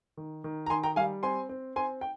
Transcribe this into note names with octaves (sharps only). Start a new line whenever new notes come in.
D#3
D#3
A#5
D#3 G#5 C6
G5 A#5
G3 F5 G#5
C4 G#5 C6
C4
C4 G#5 C6
G5